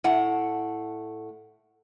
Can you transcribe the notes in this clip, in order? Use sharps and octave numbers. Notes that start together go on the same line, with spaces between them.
A2 F#5